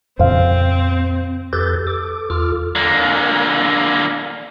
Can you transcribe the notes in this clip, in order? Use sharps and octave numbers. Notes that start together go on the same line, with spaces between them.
F2 A#2 C#3 C4 C5 F5
F2 G4 A4 B4 G6 A6
A4 D6
E2 F4 A4 D6 F6
D3 A#3